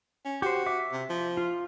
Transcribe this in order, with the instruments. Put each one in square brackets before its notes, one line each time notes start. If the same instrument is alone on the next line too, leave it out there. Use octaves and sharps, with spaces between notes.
[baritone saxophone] C#4
[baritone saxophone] F#4 [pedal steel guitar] G4 C5
[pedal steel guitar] E5 D6
[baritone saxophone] C3
F3
[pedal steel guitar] F4